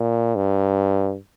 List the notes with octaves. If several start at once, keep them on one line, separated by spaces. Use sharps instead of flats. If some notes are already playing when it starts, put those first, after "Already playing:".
Already playing: A#2
G2